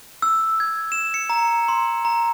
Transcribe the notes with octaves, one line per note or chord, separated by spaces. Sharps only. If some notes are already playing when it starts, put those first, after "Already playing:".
E6
G#6
E7
C#7
A#5
C6
A#5